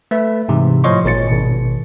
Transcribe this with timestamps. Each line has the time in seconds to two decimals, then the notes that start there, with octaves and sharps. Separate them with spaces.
0.11 A3 B4 E5
0.49 G#2 C3 E3
0.84 A2 F3 C#5 D#5 C6 C#6
1.04 G#1 A#2 C#5 A6 C#7
1.28 G#1 B2